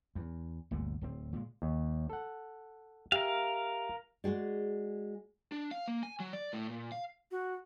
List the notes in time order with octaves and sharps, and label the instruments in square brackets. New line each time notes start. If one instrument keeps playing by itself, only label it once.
[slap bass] E2
G1 D2 A#2 D3
D1 C4
A#2 G#3
[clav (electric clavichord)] D#2
A4 F#5
[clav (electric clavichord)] G4 E5 G#5 [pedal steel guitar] A#4 F5
[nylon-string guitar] G#3 F#4 G#4 D5
[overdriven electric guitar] D4
F5
A#3
G#5
F#3
D5
A2
A#2
F5
[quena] F#4